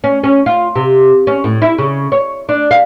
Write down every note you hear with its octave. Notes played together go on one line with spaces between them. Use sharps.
C#4
C#4
F4
C3
C#4
A2
E4
C#3
C#5
D4
F5